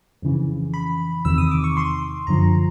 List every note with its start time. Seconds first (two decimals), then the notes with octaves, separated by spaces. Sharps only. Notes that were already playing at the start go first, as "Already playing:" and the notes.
0.22 F2 C#3 E3
0.74 B5
1.25 E2 C3 D#3 E6
1.38 D#6
1.51 D6
1.64 C#6
1.77 C6
2.27 F#2 D3 F3 A#5